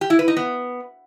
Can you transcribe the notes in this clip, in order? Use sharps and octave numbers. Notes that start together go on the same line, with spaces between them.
G4
E4
B4
D#4
B3